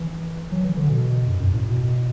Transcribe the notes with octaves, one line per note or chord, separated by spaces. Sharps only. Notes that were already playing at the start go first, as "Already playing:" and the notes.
Already playing: E3
F#3
E3
D3
B2
F#2
F#2
A2
B2